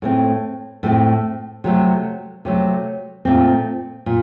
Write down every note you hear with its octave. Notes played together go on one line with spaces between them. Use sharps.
A2 A3 C4
A2 A3 C4
C3 F#3 A3
C3 F#3 A3
A#2 A3 C4
A#2